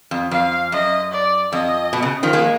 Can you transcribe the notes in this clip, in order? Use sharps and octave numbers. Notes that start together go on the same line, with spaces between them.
F2
F2 F5
F#2 D#5
D5
F2 D#5
B2
C#3
D#3 F3
G#3 A#3